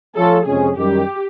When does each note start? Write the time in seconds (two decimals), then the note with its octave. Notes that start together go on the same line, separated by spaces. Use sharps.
0.15 F3 A3 C#4 F4 A4
0.46 F2 C3 F3 G#3 C#4 G#4
0.77 F#2 D#3 G3 G4